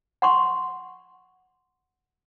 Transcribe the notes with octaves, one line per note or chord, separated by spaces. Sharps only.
F#5 C6 C#6